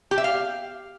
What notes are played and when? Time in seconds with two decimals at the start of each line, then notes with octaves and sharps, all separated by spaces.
0.11 G4
0.18 E5
0.24 F5